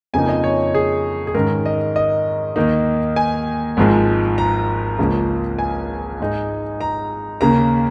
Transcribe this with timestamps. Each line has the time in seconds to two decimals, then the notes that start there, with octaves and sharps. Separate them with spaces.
0.13 F2 C#3 F3 A#3 D#4 G#5
0.29 D#5
0.44 C#5
0.74 G#4
1.27 G#4
1.34 G#2 D#3 C#4 A#4
1.66 D#5
1.96 D#5
2.56 D#2 D#3 A#3 D#4
3.16 G#5
3.77 G#1 G#2 F3 G#3
4.38 A#5
4.99 C#2 C#3 F3 A#3 C#4
5.59 G#5
6.20 G#2 G#3 D#4
6.81 A#5
7.41 D#2 C#3 A#3 A#5